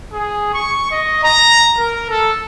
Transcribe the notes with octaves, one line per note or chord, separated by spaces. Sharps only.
G#4
C#6
D#5
A#5
A#4
A4